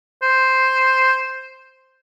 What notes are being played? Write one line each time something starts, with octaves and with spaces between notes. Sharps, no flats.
C5